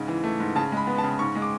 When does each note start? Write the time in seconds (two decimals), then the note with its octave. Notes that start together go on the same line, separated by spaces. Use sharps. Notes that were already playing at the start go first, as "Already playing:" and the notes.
Already playing: G#2 C#3
0.08 E3
0.24 A3
0.40 G#2
0.55 C#3 A5
0.72 G#3 B5
0.87 B3
0.98 A5
1.04 C#3
1.19 G#2 C#6
1.35 G#3
1.42 D6